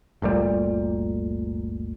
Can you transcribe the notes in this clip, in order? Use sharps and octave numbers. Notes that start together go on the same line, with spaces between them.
G1 D2 A#2 G3